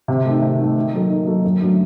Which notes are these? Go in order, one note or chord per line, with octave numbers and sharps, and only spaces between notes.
C3
D#3 A3
C3
D#3 A3
D#3
F#3 A#3 D#4 A4
D#3
F#3 A#3 D#4 A4
F#2
D3 F#3 A3